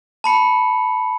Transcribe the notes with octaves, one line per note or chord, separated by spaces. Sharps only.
A5 B5 C#7